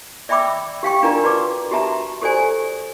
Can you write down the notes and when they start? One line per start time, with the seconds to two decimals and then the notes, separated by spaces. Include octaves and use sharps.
0.29 D5 E5 G5 B5 D6 E6
0.83 G4 F5 G5 C#6
1.03 D4 F4 A#4 D5 A#5
1.23 F#4 B4 D5 A5 D6
1.71 F#4 G4 E5 A5 A#5
2.21 G4 A4 C5 D5 G#5